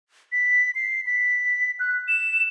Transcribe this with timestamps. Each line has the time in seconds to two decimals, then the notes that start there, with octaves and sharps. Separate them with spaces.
0.32 B6
0.75 C7
1.07 B6
1.80 F#6
2.08 E7